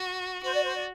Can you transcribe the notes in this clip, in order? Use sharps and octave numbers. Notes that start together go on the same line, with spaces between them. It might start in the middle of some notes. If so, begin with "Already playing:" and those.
Already playing: F#4
F#4 C5
D5
C5
D5